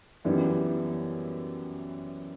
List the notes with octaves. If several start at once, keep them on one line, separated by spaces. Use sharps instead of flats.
F#2 E3 G3 B3 E4